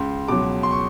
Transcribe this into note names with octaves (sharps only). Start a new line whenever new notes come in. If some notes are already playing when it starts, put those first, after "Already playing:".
Already playing: C#2 C6
B2 F#3 D6
C6
C#6